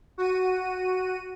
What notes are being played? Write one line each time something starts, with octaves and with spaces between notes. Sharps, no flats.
F#4 D#7